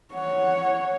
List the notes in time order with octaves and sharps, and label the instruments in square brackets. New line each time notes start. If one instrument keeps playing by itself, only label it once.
[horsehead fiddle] C#5 [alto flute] F#5